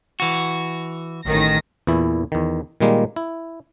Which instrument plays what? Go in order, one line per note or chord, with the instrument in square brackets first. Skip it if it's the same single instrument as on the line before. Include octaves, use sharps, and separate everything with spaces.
[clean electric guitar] E3 F#4
[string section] A1 D#3 A#6
[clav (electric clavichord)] E2 A#2 E3 E4
E2 D#3
A#2 D#3 G3 G#3 A#3
E4